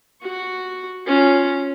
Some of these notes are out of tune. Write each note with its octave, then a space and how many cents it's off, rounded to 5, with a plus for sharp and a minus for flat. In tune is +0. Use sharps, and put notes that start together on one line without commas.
F#4 +0 C#6 +0
C#4 +0 F4 +10